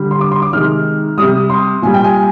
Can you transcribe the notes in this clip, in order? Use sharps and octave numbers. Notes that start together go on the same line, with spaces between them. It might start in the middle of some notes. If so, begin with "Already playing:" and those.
Already playing: D3 G3
C6
D6
C6
D6
C3 D#3 G#3 F6
C3 G3 D#6
C6
A#2 G3 G#5
G5
G#5